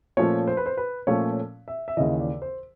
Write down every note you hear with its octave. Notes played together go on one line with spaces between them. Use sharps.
A#2 F3 A3 C#4 C#5
C5
B4
C5
B4
A#2 F3 A3 C#4 C#5
E5
E5
D#2 C#3 E3 D#5
D5
C5